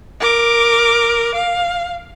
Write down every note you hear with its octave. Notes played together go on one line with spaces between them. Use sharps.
A#4 D6
F5